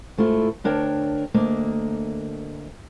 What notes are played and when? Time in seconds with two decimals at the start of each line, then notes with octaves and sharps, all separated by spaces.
0.18 G#2 A3 E4 F4 A4
0.64 D2 D4 A#4 C#5 G5 A5
1.34 D2 A3 A#3 D4 D#5